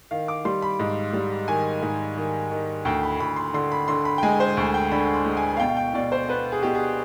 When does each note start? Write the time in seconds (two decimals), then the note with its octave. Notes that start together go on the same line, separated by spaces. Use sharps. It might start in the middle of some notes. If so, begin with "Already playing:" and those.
0.11 D#3 F5
0.28 D6
0.45 G3 C6
0.62 B5
0.79 G#2
1.13 G3
1.48 D#3 G#5
1.82 G#2
2.17 D#3
2.51 D#3
2.85 D2 G5
3.03 B5
3.20 D2 B5
3.36 C6
3.54 D3 C6
3.72 B5
3.88 D3 C6
4.05 B5
4.18 G5
4.23 G#3 G#5
4.40 C5
4.57 D2
4.74 G5
4.92 D3 B5
5.14 C6
5.26 G#3
5.37 G#5
5.57 F5
5.60 B2 G5
5.69 F5
5.77 G5
5.94 B2 D5
6.12 C5
6.29 B3 B4
6.52 G#4
6.63 B2 G4
6.75 G#4